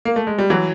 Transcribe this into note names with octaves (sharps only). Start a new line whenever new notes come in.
A#3
A3
G#3
G3
E3 F#3